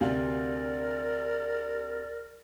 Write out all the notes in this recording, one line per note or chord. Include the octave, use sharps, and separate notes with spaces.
D2 C3 A#4 D5 F5